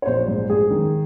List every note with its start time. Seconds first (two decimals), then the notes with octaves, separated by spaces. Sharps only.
0.02 C#5
0.06 A#1 C5
0.28 G#2
0.50 G#2 G#4
0.70 D#3